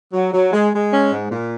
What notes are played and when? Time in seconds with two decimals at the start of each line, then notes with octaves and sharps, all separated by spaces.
0.13 F#3
0.33 F#3
0.52 G#3
0.73 G#3
0.92 C#4
1.12 G#2
1.31 A#2